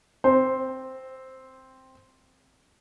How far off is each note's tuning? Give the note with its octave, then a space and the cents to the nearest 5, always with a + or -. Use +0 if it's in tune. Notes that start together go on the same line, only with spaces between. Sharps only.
C4 +0 C5 +0